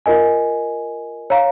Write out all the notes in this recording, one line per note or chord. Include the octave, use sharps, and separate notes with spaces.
F4 A#4 D#5 G#5
C#5 F5 A#5